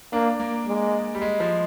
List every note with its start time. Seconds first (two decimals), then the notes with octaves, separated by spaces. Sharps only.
0.12 A#3 D4
0.40 A#3
0.68 G#3
1.15 G3
1.22 G#3
1.40 F3